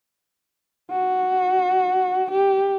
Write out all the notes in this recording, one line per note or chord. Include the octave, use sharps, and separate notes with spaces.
F#4
G4